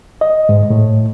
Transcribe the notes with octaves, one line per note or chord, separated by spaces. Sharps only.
D#5
G#2
A2